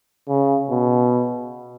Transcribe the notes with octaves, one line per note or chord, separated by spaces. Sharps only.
C#3
B2